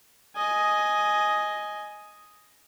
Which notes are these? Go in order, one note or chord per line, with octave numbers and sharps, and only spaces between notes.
D#5 G#5